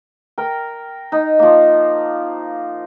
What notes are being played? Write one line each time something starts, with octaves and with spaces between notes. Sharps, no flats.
A#4 G5
D#4
F3 A#3